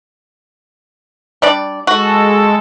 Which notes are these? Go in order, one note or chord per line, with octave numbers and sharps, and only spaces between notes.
G3 D4 D5
G#3 F#4 A4